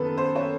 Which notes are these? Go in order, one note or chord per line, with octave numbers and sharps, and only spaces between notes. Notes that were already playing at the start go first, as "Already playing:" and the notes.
Already playing: F#2 D#3 B3 A4 B4
C5
C#5